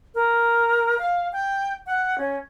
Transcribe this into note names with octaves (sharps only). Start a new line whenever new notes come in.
A#4
F5
G5
F#5
C#4